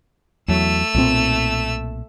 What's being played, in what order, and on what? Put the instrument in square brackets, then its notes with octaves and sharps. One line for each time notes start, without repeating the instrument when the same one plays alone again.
[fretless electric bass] E2 F#3 [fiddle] A3 E6
[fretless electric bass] B1 A#2 C4